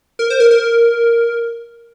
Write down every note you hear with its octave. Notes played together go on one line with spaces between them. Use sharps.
A#4
C5
A#4
A#4